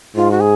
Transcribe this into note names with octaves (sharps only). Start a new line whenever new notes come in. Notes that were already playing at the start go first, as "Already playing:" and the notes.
G#2 F4
F#4
G#4